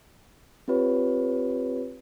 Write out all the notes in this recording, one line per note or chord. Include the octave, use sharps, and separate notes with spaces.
C4 F4 G4 B4 C#5